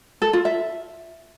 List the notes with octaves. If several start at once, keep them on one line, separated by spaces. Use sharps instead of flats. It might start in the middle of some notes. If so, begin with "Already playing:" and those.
A4
F4
E5